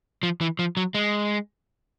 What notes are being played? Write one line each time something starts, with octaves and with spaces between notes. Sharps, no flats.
F3
E3
F3
F#3
G#3